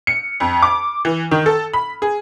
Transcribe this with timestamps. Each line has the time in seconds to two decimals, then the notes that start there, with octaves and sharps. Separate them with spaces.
0.07 C#7
0.40 F2
0.62 D6
1.05 E3
1.31 D#3
1.46 A4
1.73 B5
2.02 G#4